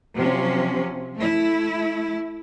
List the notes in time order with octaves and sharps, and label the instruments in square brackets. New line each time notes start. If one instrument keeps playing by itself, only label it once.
[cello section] C3 F3 F#3 C#4
A3 E4